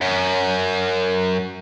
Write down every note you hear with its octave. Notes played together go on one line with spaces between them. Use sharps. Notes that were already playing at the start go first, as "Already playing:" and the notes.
F#2